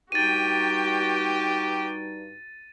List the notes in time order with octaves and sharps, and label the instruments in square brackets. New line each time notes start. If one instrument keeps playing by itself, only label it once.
[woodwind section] G2 G3 D#4 [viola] F#4 G5 [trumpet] G4 [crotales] A6 D#7